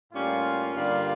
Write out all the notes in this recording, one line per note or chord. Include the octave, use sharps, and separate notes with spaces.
A2 G3 A#3 C#4 F4
G2 D3 G3 A#3 D4